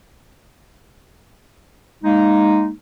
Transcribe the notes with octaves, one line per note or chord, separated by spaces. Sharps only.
G#3 A#3 D#4